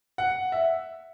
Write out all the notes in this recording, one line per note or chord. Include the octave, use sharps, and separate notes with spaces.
F#5
E5